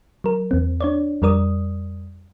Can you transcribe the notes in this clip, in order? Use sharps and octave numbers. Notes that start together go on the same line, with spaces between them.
F#3 A#4
E2 C4
D4 C#5 D5
F2 G3 A#4 D5 D#6